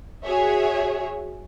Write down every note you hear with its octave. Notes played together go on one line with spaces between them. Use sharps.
F#4 G#4 C#5 E5